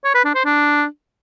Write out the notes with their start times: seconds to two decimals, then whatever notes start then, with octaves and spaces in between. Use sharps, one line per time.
0.05 C#5
0.15 B4
0.25 D4
0.35 C5
0.45 D4